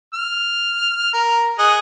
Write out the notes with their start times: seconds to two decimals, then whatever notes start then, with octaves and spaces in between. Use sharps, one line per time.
0.14 F6
1.13 A#4
1.59 G#4 D#5 F#5